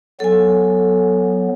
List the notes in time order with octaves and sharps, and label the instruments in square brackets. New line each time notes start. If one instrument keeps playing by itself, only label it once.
[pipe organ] F#3 B3 [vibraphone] A4 G#5